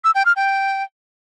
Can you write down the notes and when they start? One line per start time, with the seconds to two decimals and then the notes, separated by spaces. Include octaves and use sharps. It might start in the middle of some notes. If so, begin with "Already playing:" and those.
0.04 E6
0.15 G5
0.25 F6
0.36 G5